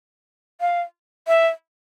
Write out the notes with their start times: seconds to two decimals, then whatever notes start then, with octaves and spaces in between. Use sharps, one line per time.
0.61 F5
1.28 E5